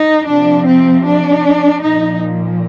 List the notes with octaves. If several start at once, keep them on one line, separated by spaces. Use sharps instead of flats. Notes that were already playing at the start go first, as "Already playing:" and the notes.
Already playing: D#4
C3 F3 D4
C4
D4
A#2 F3 D#4